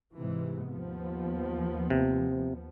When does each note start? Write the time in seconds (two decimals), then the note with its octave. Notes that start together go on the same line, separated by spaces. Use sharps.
0.14 G#2 C3 E3
0.71 D#2 F3 B3
1.90 C3